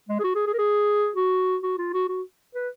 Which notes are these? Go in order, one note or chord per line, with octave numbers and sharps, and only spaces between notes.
G#3
G#4
F#4
G#4
G#4
A#4
G#4
F#4
F#4
F4
F#4
F#4
B4